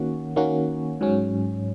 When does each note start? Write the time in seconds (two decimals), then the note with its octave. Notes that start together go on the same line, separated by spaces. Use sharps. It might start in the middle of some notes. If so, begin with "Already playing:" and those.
Already playing: D#3 A#3 C#4 F#4
0.36 D#3 A#3 C#4 F#4
1.01 G#2 F#3 C#4